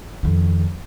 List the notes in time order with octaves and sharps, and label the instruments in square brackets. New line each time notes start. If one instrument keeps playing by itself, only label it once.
[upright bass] F2 D#3